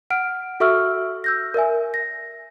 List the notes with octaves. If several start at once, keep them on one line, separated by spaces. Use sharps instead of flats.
F#5 F6 D7
F#4 A4 E5 C#6 E6 F6
E6 G6 A#6
A#4 D5 E5 G#5
A#6